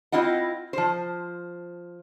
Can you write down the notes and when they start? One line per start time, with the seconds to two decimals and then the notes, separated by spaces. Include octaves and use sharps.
0.12 C4 E4 F4 D#5 F#5
0.73 F3 C5